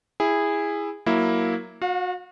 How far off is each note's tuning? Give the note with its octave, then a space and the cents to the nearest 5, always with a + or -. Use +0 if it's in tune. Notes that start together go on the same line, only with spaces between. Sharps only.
E4 +0 G#4 -15
F#3 +0 A#3 +0 E4 +0
F#4 -30 F5 +30